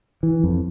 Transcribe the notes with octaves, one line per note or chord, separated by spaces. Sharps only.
E3
F2